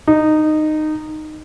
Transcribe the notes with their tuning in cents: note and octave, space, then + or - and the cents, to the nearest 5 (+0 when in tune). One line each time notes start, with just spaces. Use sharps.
D#4 -15